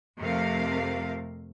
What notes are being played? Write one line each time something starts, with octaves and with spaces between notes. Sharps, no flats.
F2 C3 A3 A#4 F5